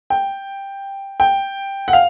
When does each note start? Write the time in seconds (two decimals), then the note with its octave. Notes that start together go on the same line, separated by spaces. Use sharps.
0.10 G5
1.20 G5
1.88 F#5
1.93 F5